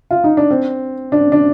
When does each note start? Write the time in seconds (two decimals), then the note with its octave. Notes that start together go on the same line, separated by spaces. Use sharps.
0.11 F4
0.24 D#4
0.37 D4
0.51 C4
1.12 D4
1.32 D4